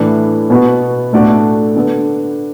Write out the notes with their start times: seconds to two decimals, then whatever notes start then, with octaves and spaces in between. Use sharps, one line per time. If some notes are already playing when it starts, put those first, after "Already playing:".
Already playing: A2 E3 D4
0.50 B2 B3 F#4
1.13 A2 A3 D4 F#4 D5
1.76 D3 B3 D4 A4